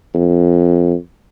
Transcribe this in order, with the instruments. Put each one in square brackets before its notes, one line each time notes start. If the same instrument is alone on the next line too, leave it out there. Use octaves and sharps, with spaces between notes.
[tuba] F2